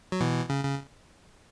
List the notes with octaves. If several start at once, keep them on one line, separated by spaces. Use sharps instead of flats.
F#3
B2 E3
C#3
C#3